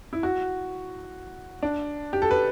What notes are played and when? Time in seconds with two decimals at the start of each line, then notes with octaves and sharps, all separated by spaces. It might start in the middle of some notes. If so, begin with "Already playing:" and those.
0.13 E4
0.23 F#4
1.63 D4
2.13 G4
2.22 A4
2.31 B4